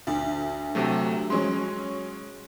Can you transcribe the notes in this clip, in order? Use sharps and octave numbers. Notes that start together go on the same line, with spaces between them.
D2
C3 F#3 A3
F#3 G#3 C#4 C6